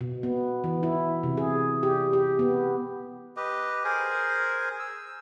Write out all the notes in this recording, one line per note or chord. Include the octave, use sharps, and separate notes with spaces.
B2
B3
E3
E4
C3
G#4
G4
G4
B3
G4 B4 D#5
G#4 A#4 C5 G#5
E6